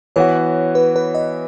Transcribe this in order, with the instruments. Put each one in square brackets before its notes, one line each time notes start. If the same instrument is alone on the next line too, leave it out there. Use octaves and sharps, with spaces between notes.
[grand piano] E3 B3 F#4 [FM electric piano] C#5
[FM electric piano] B4
B4
D#5